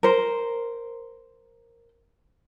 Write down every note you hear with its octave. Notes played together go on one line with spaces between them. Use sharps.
A#4 C5